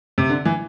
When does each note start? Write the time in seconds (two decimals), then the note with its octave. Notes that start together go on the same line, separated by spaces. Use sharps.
0.18 C3
0.30 D3
0.45 E3